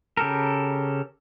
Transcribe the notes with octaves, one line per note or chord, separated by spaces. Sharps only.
C#3 G4 A4 A#4